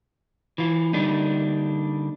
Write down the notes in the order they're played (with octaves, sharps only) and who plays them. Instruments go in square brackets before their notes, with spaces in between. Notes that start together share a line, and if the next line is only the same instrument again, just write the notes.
[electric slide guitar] E3 F4
D3 G3 A#3 D4 D#4